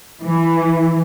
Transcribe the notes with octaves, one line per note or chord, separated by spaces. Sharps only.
E3